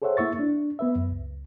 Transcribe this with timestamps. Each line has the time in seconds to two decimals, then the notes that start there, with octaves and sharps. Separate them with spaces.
0.02 G#4 A4 C5 C#5 E5 F#5
0.17 A#3 E4 E5 C#6 A6
0.39 D4
0.79 B3 B4 E5
0.96 F#2
1.12 C#2